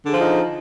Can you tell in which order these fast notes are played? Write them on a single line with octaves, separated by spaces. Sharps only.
D3 G#4 F3 F4 D#4